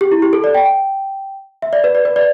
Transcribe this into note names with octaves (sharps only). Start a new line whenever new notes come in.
G4
E4
G4
A4
D5
G5
G5
E5
D5
B4
D5
B4
D5